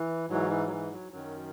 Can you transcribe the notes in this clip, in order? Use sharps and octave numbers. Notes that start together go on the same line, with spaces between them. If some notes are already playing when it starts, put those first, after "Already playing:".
Already playing: E3
G#2 E3 F#3
E3
F#3
E3
F#3
F#2 D#3 F#3